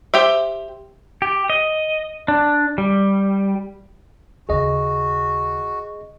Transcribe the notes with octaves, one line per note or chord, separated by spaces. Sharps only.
G4 C5 E5
G4
D#5
D4
G3
D#2 C#3 F#4 G#4 D#5